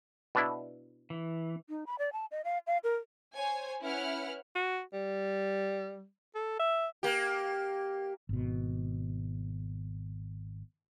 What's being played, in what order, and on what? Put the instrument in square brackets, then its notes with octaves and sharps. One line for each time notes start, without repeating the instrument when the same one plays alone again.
[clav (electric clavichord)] B2 D4 E4
[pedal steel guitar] E3
[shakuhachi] D#4
B5
D5
A5
D#5
F5
F5
A#4
[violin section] C5 C#5 G#5
C#4 E4 B4 F#5 F6
[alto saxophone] F#4
G3
A4
E5
[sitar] A#3 G4
[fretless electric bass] G#1 B2